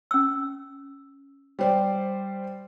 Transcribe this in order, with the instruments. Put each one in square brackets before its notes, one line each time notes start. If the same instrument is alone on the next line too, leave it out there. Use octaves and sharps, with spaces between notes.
[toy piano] C#4 E6
[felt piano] G3 C5 D5